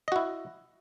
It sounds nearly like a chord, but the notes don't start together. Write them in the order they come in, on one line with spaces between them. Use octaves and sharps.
D#5 F#4 E4